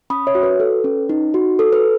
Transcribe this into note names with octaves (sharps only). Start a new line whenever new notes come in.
C#4 B5 D#6
C#5 E5
F#4
B4
A4
C#4
D#4
F#4
A4
B4